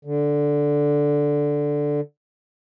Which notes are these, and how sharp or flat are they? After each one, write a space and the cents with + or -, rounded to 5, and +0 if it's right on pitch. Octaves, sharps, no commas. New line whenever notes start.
D3 -5